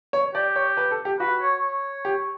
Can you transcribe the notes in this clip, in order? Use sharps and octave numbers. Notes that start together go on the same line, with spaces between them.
C#5
G4 D5
C#5
B4
A4
G4
F#4 B4
C#5
C#5
G4